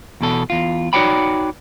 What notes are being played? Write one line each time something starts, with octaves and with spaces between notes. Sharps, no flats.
E2 B2 A4
E2 F4
D#4 F#4 C#5 D5 G5 B5